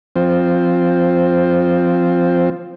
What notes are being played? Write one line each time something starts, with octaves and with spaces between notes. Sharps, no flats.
F3 C4